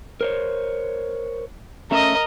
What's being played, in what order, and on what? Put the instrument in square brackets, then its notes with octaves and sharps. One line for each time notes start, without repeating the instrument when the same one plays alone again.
[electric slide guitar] A#4 C5 C#5
[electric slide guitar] A3 C#4 E5 [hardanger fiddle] A#4 D#5